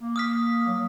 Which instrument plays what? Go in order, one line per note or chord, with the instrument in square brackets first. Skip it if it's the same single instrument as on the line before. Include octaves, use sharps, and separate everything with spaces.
[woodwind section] A#3
[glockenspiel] D#6 F6 B6
[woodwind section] F#3